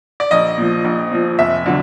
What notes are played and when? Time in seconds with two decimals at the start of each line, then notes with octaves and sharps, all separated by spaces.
0.20 D5
0.31 A#1 D#5
0.58 A#2 F3
0.85 A#1
1.11 A#2 F3
1.38 F1 E5
1.66 D3 F#3